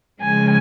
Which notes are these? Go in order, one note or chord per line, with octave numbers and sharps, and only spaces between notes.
C#3 F3 G#3 G#5